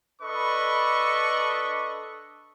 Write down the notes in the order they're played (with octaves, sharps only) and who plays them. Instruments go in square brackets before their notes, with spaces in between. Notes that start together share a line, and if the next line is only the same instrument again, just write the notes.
[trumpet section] D4 A4 B4 D#5 B5 C#6